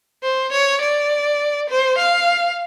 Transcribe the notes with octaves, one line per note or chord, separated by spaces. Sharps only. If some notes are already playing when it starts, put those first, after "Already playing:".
C5
C#5
D5
C5
F5